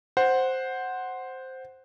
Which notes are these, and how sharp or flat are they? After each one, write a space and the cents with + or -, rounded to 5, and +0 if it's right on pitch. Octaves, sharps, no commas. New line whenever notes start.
C5 +0 F#5 +0